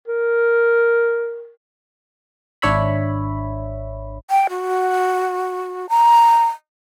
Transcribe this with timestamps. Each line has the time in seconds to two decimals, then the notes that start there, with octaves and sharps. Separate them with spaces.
0.08 A#4
2.62 G#1 D4 C#5 E5 B5
4.30 G5
4.50 F#4
5.90 A#5